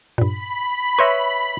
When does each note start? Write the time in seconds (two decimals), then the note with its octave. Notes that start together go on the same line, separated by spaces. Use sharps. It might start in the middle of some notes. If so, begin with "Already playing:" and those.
0.18 G2 A#2 B5
0.99 B4 C#5 E5 C6 G6 A#6